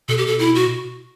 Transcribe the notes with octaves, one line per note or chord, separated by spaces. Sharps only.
B2 A4
G4
A4
E4
F#4